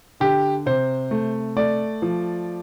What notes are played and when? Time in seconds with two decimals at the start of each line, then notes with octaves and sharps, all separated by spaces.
0.20 D3 G4
0.66 C3 C5
1.11 A3
1.56 A3 D5
2.02 F3